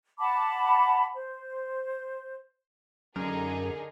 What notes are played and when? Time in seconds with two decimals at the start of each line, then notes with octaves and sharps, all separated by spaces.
0.18 F#5 A5 B5 D6
1.13 C5
3.16 F#2 D3 D#4 G#4 A#4